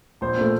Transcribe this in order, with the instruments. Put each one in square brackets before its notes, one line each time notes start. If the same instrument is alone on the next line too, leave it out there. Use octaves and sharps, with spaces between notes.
[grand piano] A#1 C5
A#2 A3